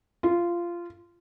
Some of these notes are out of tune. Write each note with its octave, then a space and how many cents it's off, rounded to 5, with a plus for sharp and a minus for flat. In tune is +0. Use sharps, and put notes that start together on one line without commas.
F4 -15